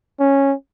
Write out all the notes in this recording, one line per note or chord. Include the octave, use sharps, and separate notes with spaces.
C#4